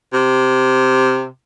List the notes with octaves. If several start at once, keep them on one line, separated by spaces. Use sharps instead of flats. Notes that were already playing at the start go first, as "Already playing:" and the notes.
C3